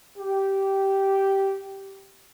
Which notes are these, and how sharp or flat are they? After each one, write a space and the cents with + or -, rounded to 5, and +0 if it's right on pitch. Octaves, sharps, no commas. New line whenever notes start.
G4 -10